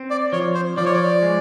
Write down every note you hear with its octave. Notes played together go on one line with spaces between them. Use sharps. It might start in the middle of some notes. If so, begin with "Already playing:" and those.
Already playing: C4
D5
F3 C#5
C5
F3 D5
C#5
D5
G#3